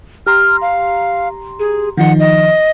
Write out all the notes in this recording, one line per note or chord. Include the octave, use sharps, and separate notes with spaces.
G4 A#5 C6 F6
F5
G#4
D#3 F3 D#4 F#5
D#5